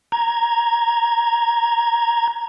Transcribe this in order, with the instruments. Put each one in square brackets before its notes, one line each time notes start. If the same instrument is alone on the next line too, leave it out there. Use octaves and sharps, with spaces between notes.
[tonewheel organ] A#5 G#6